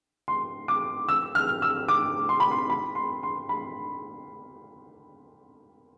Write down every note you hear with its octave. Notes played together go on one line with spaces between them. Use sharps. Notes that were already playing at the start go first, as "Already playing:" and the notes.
C6
D6
E6
F6
E6
D6
C6
B5
C6
B5
C6
C6
B5